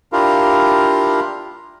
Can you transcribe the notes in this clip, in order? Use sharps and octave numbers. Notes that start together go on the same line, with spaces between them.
D4 E4 F4 G4 A#4 F5